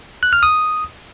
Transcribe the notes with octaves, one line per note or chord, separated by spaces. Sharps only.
F#6
F6
D#6